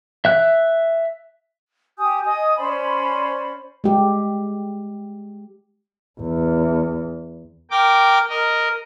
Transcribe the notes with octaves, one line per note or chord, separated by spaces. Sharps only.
E5 F#6
G4 G#5 D#6 G6
D#5 G#5 D#6
C#4 C5 D5 B5
G#3 G4
E2
A#4 G5 D6
A#4 D#5